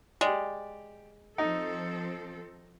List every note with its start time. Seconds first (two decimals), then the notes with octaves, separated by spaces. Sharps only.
0.21 G#3 G4 D5
1.38 F3 C4 D#4 A4